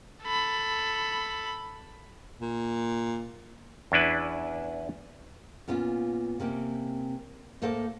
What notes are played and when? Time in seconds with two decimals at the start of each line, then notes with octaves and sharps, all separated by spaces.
0.23 A4 B5
2.41 A#2
3.92 E2 C#4 D4 E4 B4
5.68 A#2 B3 C#4 F4
6.40 C3 A#3 C4 C#4
7.62 A2 A#3 A4 C5 F5